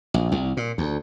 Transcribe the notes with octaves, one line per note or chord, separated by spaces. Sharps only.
A#1
C2
A#2
D2